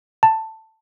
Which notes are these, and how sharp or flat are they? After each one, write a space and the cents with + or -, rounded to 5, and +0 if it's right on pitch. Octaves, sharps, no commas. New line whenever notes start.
A5 +10